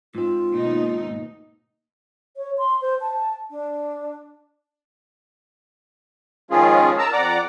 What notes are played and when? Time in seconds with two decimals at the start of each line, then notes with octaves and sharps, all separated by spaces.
0.15 G#2 C4 F4
0.52 D#2 B2 D#4
2.37 C#5
2.57 C6
2.81 C5
3.00 A5
3.50 D4
6.51 D#3 F3 G#3 C#4 F4 G#4
6.98 A#4 A5 A#5 E6
7.13 F2 D5 F#5 A#5 D6